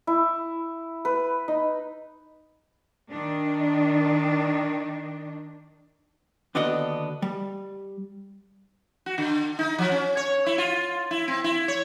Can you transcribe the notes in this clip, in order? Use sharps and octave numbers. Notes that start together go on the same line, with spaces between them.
E4
B4
D#4
D#3 D4
D#2 D3 B3 D4 F#4 D#5
G3
F#4
D3
D#4
F3
C#4
C#5
E4
F4
E4
C4
E4
C#5